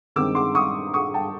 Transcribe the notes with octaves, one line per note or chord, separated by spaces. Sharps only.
G2 D#3 G#3 C4 D6 E6
C6 D6
C#6 D#6
C#6 D#6
G5 A5